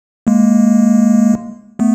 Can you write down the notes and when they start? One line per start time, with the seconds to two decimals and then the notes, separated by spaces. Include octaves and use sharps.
0.27 G#3 A#3
1.79 A3 B3